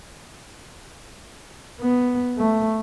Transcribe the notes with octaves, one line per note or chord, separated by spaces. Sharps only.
B3
A3